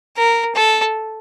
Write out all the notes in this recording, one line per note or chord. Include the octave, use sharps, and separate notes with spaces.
A#4
A4